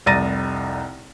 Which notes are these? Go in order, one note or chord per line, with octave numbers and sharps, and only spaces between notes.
F1 C2 A#5 A6 A#6 D#7